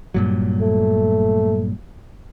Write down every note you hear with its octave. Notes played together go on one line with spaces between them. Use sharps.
G2 A#2 F#3
A3